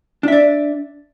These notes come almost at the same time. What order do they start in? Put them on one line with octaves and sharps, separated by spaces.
D4 E5 D5